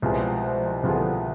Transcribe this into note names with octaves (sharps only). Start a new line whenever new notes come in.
C2 B2 F3 G#3 B3 F4 G#4
C2 B2 D3 F3 B3 F4 G#4